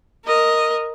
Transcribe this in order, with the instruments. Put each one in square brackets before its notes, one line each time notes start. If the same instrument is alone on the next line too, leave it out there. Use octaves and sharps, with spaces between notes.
[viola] A#4 D#5